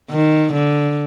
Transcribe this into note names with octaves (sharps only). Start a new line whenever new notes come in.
D#3
D3